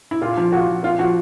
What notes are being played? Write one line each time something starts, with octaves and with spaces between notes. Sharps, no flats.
E4
A#2 F4
F3
A#2 F#4
F3
A#2 F4
F3 F#4